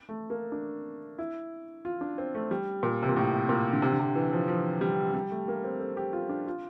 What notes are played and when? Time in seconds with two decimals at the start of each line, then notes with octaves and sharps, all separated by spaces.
0.09 A3
0.30 A#3
0.52 D4
1.18 E4
1.85 F4
2.01 D4
2.18 C4
2.35 A3
2.51 G3
2.83 A#2
3.02 C3
3.09 A#2
3.16 A2
3.49 A#2
3.72 D3
3.82 C3
3.92 D3
4.00 C3
4.15 E3
4.33 F3
4.48 F3
4.81 G3
5.14 G3
5.31 A3
5.48 A#3
5.64 C4
5.80 A4
5.97 G4
6.13 F4
6.29 D4
6.47 F4